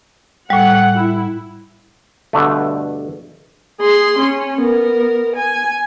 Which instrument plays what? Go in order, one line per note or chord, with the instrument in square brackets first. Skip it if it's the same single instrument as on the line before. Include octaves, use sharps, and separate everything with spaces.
[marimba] A2 G3 [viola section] F#5
[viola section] E4
[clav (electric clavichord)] G2 B2 D3 A3
[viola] G#4 C6
C#4
B3 A#4
G#5